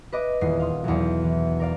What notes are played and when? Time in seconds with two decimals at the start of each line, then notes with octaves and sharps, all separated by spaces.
0.13 B4 D#5 D6
0.41 D#1 E2 D#6 C7
0.59 F5 C6 D#6
0.84 B1 E2
1.24 E3
1.60 A#4 D5 F5